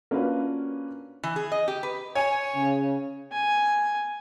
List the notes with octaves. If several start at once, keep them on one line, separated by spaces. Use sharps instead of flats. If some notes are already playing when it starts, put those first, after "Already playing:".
A#3 C#4 D4 F4 F#4 B4
E3
G#4
D#5
G4
B4
C#5 G#5
C#3
G#5